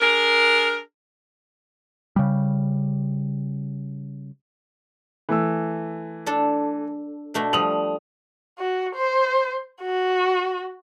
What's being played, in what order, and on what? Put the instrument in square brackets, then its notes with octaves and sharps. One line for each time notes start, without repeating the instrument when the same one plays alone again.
[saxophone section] D4 G#4 A#4
[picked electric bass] C#3 G3
[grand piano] E3 A3 E6
[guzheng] D4 A4
B2 A3 D4
[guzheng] F3 G3 [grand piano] D#6 F7 F#7
[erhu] F#4
C5
F#4